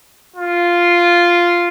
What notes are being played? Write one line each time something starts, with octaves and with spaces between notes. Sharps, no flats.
F4